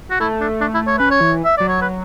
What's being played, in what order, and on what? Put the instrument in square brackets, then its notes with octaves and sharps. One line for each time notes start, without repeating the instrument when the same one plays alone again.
[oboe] F#4
[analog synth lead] A3 [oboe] E4
[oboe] D4
D4
E4
C#5
[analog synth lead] C#4 [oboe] B4
[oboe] C#5
[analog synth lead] E3
[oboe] E5
[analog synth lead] F#3 [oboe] D5
[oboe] C#5
B4